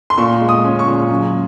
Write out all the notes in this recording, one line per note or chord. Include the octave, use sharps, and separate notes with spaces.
C6
A#2 C#6
G#3
D#6
C#4
C#6
A#2
F#2